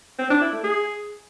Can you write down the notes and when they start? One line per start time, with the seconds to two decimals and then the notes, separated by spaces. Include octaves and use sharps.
0.18 C4
0.30 D4
0.41 E4
0.52 A3
0.64 G#4